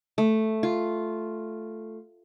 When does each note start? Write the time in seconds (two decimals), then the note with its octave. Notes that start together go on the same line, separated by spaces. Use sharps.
0.18 A3
0.63 F4